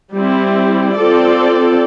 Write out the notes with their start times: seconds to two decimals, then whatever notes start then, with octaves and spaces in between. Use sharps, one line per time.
0.12 G3 C4 E4
0.95 C4 F4 A4 D5